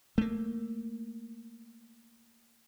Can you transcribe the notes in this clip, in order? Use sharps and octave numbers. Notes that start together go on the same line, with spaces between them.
A3 A#3